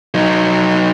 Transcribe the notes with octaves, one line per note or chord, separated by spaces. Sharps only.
F#3 D#4